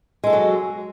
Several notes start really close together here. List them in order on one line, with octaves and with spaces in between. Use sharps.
G#3 A4 F#4 F#3